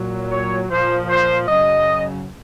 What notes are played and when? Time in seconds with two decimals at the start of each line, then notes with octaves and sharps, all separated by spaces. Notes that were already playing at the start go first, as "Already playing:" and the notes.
Already playing: A#2 F#3
0.30 C#5
0.69 A#2 F3 C5
1.09 C5
1.48 F#2 C#3 F#3 D#5